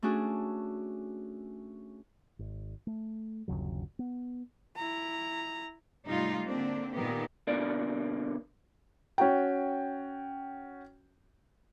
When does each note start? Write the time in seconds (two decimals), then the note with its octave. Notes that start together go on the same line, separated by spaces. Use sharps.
0.02 A3 C#4 D4 F#4 G#4
2.39 G#1
2.87 A3
3.48 G1 D#2 C#3 F#3
3.99 B3
4.77 E4 A#5
6.06 G#2 C3 G3 A3 D#4 F4
6.46 D3 A#3 C4 D4
6.95 A#2 D#3 B3 G4
7.47 B2 D3 A#3 D5
9.18 C#4 F#4 G5